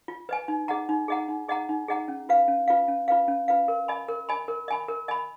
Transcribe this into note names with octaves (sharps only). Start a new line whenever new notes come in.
F4
B4 D#5 G#5
D#4
G#4 D#5 F#5 A#5
D#4
G#4 D#5 F#5 A#5
D#4
G#4 D#5 F#5 A#5
D#4
G#4 D#5 F#5 A#5
C#4
F4 B4 F5
C#4
F4 B4 F5
C#4
F4 B4 F5
C#4
F4 B4 F5
A#4
D#5 G#5 B5
A#4
D#5 G#5 B5
A#4
D#5 G#5 B5
A#4
D#5 G#5 B5